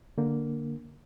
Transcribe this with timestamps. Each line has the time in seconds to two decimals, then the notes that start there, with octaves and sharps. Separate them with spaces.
0.18 D3 A#3